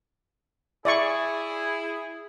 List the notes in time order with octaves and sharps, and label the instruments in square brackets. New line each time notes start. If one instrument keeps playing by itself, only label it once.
[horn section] E4 G#4 [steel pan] D5 E5 C#6